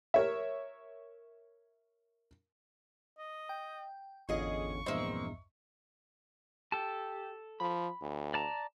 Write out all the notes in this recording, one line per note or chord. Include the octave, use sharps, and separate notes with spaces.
A#4 C#5 E5
D#5
G5
G#1 E2 D3 C#4 F4 G#4 D#5 C#6
A#1 E2 G2 A#3 C4 D#5 E5
G4 A4 A5
F3 B5
D2
D5 A5 A#5